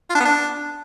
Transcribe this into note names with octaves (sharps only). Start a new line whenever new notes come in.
F4
D4
B3
D4